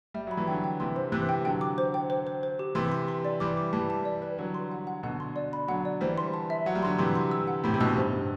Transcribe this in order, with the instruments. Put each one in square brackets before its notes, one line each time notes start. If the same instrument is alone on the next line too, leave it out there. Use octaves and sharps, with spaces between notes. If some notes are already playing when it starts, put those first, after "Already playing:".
[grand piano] G3 [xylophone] E5
[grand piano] F#3 [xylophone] B5
[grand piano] E3
[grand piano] D3 F#3 [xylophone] G5
[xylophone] G5
[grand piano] C3 E3 [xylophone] C6
[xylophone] C5
[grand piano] C3 E3 [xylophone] F#6
[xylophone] G5
[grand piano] D3 F#3 [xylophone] G5
[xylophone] D6
C5
G5
C5
C5
C5
G4
[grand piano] C3 E3 [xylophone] C6
[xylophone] C6
C6
D5
[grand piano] E3 G3 [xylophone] D6
[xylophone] D6
[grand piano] E3 G3 [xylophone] A5
[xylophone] A5
D5
B4
[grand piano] D3 F#3 [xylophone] B4
[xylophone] C6
F#5
F#5
[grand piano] B2 D3 [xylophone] F#5
[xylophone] C6
D5
B5
[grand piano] D3 F#3 [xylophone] F#5
[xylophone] D5
[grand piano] E3 G3 [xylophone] C5
[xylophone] C6
A5
E5
[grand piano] F#3 [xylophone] F#5
[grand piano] G3
[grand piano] D3 F#3 [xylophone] C6
[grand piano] C3 E3 [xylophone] C6
[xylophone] C6
E6
F#5
[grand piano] A2 C3 [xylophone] B5
[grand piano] C3
[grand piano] G2 B2 [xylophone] E6
[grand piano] G2 [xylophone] C5
[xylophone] C5